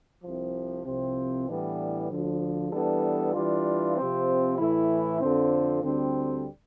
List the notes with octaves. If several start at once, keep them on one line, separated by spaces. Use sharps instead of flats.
C2 C3 F3
C2 C3 F3 C4
A2 E3 G3 B3 D4
D2 D3 F3
E3 G3 B3 D4 A4
E3 G3 D4 F4
C3 F3 C4
A2 E3 A3 E4
F2 D3 F3 C4
D2 D3 G3 C4